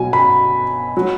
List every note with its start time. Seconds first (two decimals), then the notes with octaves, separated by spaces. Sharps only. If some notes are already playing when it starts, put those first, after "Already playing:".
Already playing: B2 F#3 G#5
0.13 B5
0.97 F#3